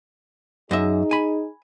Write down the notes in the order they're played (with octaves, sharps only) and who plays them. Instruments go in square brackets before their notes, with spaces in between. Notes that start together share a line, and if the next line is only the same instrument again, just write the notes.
[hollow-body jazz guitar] F#2 D#5 E5 [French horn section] D#4 G#4
[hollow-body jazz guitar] G#5 B5